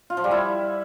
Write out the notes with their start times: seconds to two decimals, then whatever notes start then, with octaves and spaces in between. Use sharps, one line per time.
0.10 F4
0.17 F3
0.24 G3
0.31 E4